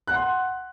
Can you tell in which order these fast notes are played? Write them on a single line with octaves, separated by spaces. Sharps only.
F#6 F#5 C6